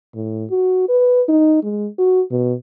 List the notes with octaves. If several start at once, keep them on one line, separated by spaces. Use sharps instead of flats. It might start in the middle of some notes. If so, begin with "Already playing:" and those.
A2
F#4
B4
D#4
G#3
F#4
B2